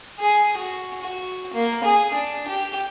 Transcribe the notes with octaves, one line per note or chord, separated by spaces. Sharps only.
G#4
F#4
F#4
A#3
G#4
D4
G4